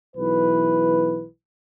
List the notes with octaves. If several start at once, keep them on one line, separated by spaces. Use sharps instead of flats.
B1 E3 B4